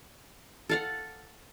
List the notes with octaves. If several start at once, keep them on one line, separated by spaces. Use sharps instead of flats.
A4 F5 F#5